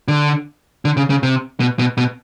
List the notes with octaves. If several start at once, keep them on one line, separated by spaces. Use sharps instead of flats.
D3
D3
C#3
C#3
C3
B2
B2
B2